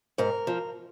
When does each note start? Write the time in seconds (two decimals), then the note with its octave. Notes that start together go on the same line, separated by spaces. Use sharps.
0.18 G#2 A#4
0.47 F3